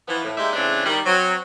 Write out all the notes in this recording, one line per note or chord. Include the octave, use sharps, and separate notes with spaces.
E3 F3 B3
A2
G#3 A#3 D#4 G4 D5 E5
C#3 E3 G#3 A3 C4 D4
D#3 G3
F#3 C4